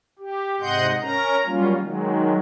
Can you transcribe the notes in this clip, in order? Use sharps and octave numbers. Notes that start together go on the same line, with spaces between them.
G4
G#2 C3 D#5 F#5 C6 G6
C#4 A#4 A#5
F#3 G3 A#3 C#4 F4
D#3 F#3 G#3